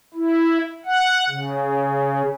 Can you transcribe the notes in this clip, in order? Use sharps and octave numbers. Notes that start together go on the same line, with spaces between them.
E4
F#5
C#3